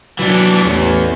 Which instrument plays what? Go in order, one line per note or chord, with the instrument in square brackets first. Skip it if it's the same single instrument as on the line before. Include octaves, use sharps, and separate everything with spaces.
[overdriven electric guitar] E3 D4 [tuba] F#3
[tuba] A1 [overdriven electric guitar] E2